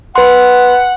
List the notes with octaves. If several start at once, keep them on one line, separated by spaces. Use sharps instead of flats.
B4 F#5 C6